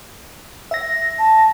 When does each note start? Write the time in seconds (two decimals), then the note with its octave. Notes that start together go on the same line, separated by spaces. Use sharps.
0.71 E5 A#6
1.19 A5